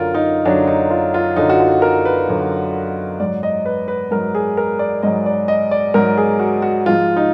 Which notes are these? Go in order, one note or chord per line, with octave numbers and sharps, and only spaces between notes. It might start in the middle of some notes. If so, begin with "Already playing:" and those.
Already playing: F#2 D3 F#3 F4 A#4
D#4
F#2 D3 F#3 D4
D#4
F4
F4
F#2 D3 F#3 D#4
F#4
F4
A#4
B4
F#2 D3 F#3
G#2 F#3 D5
D#5
B4
B4
G#2 F#3 A#4
G#4
A#4
D5
G#2 F#3 D#5
D5
D#5
D5
G#2 F#3 A#4
G#4
F#4
F#4
G#2 F3 G#3 F4
D#4